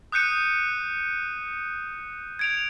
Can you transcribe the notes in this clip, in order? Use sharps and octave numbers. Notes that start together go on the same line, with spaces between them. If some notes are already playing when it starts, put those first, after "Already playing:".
D#6 F#6 G6 C#7 D#7
G#6 D7 F7